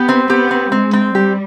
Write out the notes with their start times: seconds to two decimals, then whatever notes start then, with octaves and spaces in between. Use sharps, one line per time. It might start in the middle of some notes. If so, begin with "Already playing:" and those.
Already playing: B3 G4
0.09 C4
0.30 B3 G4
0.51 C4
0.72 G#3 C4
0.93 C4
1.15 G3 G4